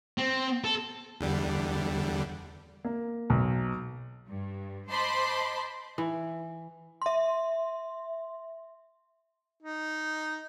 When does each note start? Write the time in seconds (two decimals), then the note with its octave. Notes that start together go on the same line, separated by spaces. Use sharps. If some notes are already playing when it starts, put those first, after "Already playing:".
0.18 C4
0.64 A4
1.21 E2 D3 G3
2.85 A#3
3.30 B1
4.28 G2
4.90 C5 D#5 A5 B5 C6 D6
5.98 E3
7.02 E5 C6
9.63 D#4